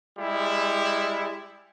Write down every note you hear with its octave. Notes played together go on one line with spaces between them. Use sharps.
G3 G#3 E4